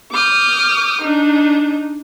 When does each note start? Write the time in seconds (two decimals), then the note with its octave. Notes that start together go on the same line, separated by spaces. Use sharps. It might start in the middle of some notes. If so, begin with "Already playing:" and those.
0.11 D6 D#6 F6 G6
1.01 D4 D#4